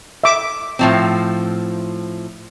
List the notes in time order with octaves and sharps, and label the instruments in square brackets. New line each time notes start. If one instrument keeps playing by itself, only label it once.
[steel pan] E5 D6
[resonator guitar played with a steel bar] A2 F3 C4